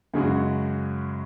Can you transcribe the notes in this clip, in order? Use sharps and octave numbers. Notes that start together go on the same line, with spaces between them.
F#2 C#3 G#3 C#4 F#4